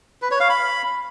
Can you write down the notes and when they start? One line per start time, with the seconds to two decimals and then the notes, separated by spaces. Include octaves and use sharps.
0.22 B4
0.31 C#5
0.40 F5
0.49 B5